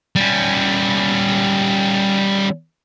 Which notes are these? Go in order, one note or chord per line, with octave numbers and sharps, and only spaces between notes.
G3 C#4